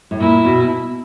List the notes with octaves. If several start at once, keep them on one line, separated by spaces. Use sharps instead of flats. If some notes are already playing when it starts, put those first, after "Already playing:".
A2
A#2 E4
B2